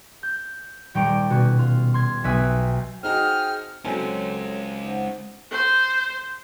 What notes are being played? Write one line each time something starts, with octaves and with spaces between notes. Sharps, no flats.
G6
D#1 G3 G5 A#5 C#6 D7
B2 C#4 F#4
F4
C6 G#6
B1 B4 E5 G5 G#5 E6
C4 D#4 F#4 G#4 G5 F6
F#3 G#3 C4 C#4 A4 C#5 G#5
D#4 C5 F#5
C5